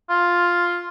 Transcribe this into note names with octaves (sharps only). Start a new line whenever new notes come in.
F4